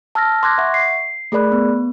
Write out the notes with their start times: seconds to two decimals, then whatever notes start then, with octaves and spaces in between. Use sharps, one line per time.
0.15 A5 E6 F6 A6 A#6
0.43 C6 D6 F#6 G#6 A#6
0.58 E5 F#5 C#6
0.74 C7
1.32 A3 G#4 A#4 D5 B5 F#6
1.52 B3